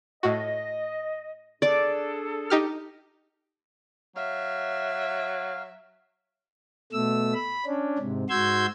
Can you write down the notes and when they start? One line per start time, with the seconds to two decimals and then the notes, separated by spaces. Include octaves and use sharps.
0.23 A2 F#4 D#5
1.62 D4 G#4 A4 D5 D6
2.50 D#4 G4 F6
4.16 F#3 E5 F5
6.93 B2 A3 E6
7.34 B5
7.66 C#4 D4
7.99 G#2 C3
8.29 G#2 F#4 C6 E6 G6 G#6